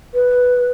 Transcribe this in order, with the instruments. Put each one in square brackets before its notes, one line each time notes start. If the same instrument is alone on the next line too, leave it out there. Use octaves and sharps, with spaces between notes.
[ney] B4